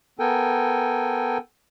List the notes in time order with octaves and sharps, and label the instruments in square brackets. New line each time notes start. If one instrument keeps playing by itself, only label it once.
[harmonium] B3 A4 A#4 G5 G#5